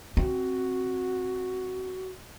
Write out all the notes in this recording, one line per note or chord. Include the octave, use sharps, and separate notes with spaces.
C4 F#4